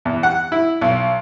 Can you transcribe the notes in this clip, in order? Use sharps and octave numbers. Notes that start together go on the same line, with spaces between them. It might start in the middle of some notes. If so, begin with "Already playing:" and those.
E2
F#5
E4
B1